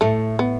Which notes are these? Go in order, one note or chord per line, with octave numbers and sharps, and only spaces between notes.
A2 A3
B3